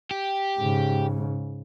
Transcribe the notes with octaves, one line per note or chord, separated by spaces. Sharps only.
G4
G#2 C#3